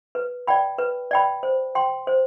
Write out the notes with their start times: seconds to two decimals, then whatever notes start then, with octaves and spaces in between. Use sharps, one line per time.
0.15 B4
0.47 D5 G5 B5
0.78 B4
1.11 D5 G5 B5
1.43 C5
1.75 G5 C6
2.07 C5